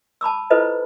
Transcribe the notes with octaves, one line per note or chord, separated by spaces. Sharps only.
A5 B5 D6 E6
E4 F4 A4 B4 C5 D#5